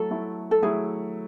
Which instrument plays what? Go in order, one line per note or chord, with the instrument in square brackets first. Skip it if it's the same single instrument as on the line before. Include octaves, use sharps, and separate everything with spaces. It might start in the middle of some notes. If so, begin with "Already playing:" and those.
Already playing: [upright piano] F#3 A3 E4 [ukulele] A4
[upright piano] F#3 A3 E4
[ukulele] A4
[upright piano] F#3 A3 E4 [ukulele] G#4